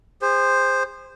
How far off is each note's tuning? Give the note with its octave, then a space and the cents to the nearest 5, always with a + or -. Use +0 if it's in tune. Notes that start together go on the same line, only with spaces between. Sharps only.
G#4 -40 C5 +0